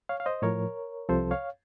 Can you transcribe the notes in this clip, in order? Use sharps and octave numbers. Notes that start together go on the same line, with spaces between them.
C#5 F5
F5
C5 D#5
A2 F3 A#4 C#5
C2 C3 F3 A4 C5
C#5 F5